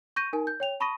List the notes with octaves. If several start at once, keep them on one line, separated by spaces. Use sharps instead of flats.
C#6 G6 A#6 D#7
D#4 A#4 G#5
G6
C#5 G5 F7
A5 B5 C#6 D#6 A#6 D#7